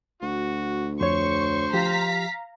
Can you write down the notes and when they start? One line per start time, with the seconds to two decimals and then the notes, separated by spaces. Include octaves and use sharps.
0.22 D2 F#4
1.01 F2 C5 C#5 C#6
1.73 F3 G4 F5 A#5 B6